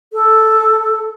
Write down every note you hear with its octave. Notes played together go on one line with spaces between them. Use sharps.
A4